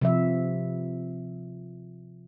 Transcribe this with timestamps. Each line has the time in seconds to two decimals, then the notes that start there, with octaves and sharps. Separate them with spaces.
0.01 C3 F3 E5